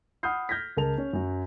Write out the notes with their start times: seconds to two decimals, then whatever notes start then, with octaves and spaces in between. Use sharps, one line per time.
0.23 F#5 B5 D#6 F6 G6 C7
0.49 F6 G6 G#6 A#6 B6
0.77 C#2 A#4 A5 F7
0.98 C#4
1.13 F#2 F#3